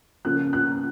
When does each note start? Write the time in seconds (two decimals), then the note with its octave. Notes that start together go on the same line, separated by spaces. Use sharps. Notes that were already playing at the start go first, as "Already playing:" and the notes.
0.25 C#3 F3 A#3 C#4 F#6
0.53 F#6